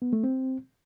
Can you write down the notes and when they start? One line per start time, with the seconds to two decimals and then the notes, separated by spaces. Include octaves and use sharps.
0.02 B3
0.13 A3
0.23 C4